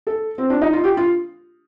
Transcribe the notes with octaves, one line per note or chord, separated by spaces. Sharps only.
A4
C4
D4
D#4
F4
G4
F4